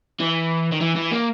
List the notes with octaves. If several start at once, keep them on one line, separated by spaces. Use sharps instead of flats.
E3
D#3
E3
E3
A#3